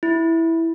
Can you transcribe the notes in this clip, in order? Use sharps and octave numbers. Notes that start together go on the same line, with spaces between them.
E4